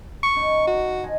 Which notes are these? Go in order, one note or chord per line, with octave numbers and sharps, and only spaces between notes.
C#6
C#4 D#4
F#4
F3 D#5 G#5